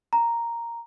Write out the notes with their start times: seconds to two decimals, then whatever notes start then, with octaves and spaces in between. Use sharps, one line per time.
0.13 A#5